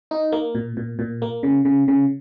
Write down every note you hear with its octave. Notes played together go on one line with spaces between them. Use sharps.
D#4
A#3
A#2
A#2
A#2
A#3
C#3
C#3
C#3